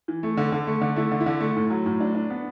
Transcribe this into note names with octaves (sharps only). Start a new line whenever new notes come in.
E3
A3
D3
D3
A3
D3
A3 E4
D3
E4
D3
A3
A2
F#3
A2
D4
D4
B3